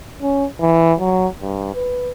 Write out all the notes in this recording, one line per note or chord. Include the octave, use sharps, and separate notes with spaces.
C#4
E3
F#3
G2
B4